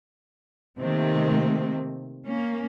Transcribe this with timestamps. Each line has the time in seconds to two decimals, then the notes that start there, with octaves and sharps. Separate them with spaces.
0.79 C3 D#3 A3 A#3 C4
2.26 A#3 C#4